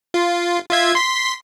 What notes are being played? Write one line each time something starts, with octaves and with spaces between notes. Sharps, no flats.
F4
F4 E5 G#6
C6 B6